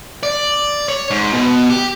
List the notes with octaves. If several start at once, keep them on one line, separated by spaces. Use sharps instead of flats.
D5
C#5
G#2
B2
G4